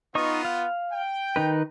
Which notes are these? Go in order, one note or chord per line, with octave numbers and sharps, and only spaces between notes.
B3 D#4 F4 D#5 C#6
F5
G5
D#3 D#4 B4